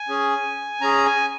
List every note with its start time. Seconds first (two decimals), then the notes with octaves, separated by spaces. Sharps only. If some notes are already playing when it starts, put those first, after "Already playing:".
Already playing: G#5
0.09 C#4 G#4
0.81 C#4 G#4 A#5
1.06 G#5